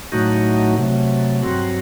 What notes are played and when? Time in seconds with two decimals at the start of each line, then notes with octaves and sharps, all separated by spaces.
0.12 A2 F#3 A3 D#4 F#4
0.78 C3 F#3 A3
1.42 G2 F#3 C4 F#4